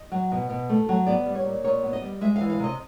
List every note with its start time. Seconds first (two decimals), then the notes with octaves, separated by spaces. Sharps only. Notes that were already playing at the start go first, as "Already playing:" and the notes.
Already playing: D#5
0.12 F#3
0.32 B2
0.50 B2
0.70 A3
0.89 F#3
1.07 B3 D5
1.26 G3
1.35 C#5
1.46 A#2
1.64 A#2 C#5
1.83 B3
1.93 D#5
2.02 G3
2.21 G#3 E5
2.36 F5
2.41 E3
2.50 F5
2.60 C3 D#5